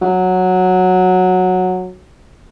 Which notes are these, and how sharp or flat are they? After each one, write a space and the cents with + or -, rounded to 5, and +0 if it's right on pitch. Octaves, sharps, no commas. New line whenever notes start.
F#3 -10